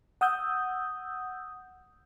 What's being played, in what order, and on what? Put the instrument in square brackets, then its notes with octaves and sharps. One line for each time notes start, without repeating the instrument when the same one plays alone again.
[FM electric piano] F#5 D#6 E6 G6